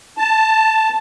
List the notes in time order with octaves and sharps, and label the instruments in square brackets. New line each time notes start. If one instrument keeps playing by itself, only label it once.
[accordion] A5